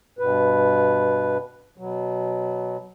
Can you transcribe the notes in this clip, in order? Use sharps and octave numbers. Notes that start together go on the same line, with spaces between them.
G2 B2 B4
B2 F#3